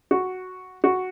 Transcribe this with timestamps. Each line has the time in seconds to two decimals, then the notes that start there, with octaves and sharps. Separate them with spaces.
0.11 F#4
0.84 F#4